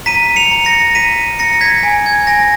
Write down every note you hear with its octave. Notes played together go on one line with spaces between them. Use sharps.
A#5 B6 D#7
C#7 F7
A#5
A#6 C#7
A#5 B6 D#7
A#5 A#6 C#7
G#6 B6
G#5
G#6
G#5 A#6